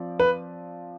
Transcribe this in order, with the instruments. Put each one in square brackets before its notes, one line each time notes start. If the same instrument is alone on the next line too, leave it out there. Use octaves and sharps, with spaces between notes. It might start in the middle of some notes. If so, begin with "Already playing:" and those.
Already playing: [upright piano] F3 C4 D5
[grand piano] B4